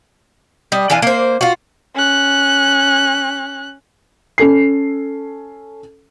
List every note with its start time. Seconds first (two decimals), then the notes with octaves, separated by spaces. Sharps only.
0.72 G3 D#5
0.90 E3 D4 F4 G#5
1.02 A#3 C5
1.41 F4 F#4
1.95 C#4 F#6
4.38 C#4 A4 C7